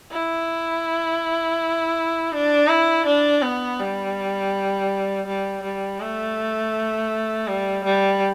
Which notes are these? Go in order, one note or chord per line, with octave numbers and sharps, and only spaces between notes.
E4
D4
E4
D4
B3
G3
G3
G3
A3
G3
G3